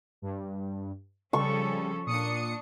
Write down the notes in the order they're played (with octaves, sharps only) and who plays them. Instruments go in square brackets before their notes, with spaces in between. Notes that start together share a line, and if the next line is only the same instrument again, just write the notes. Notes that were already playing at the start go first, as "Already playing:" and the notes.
[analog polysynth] G2
[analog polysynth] C#3 G3 [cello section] F3 C#4 A4 [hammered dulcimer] C#6
[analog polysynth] A#2 D#6 C#7 [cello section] D4